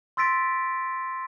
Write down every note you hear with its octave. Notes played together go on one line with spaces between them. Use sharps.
C6 E6 A6 B6 D7